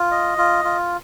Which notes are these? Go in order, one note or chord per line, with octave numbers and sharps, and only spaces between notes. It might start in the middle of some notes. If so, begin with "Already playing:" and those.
Already playing: F4
D#5
F4
F4